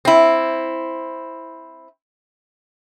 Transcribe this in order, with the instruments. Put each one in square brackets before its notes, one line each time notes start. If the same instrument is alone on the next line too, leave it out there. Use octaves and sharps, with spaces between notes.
[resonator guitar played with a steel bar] C4 E4